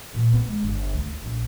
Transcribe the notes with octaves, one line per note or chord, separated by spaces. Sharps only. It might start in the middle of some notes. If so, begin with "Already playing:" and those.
A#2
B3
G#3
G1
D2
F4
A#1